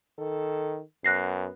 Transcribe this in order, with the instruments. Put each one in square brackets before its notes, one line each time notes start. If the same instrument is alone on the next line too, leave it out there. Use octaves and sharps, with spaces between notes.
[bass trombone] D#3 [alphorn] A4
[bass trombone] F#2 [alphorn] B3 [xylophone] F#6 A#6 C7